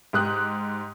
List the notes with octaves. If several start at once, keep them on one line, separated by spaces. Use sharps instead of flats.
G#2 G4 D#6 F#6